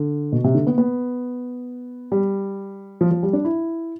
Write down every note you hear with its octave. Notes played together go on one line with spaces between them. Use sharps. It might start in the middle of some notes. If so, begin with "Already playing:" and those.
Already playing: D3
B2
C3
D3
B3
B3
G3
F3
F3
G3
D4
E4